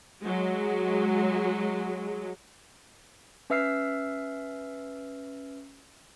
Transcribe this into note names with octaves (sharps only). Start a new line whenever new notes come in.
F#3 G#3
C#4 B4 E5 E6 F6 C7